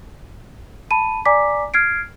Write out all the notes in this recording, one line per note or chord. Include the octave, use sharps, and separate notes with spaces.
A5 B5 D#7
D5 G#5 A#5 D6 B6
F6 G#6 C7 D7